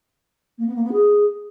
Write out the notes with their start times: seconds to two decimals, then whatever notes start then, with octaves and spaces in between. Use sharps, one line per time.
0.58 A#3
0.66 B3
0.74 A#3
0.84 B3
0.92 G#4